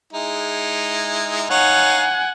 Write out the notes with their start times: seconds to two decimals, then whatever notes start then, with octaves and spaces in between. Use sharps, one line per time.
0.13 G#3 D#4 E4
1.50 D#4 C#5 F5 F#5 G#5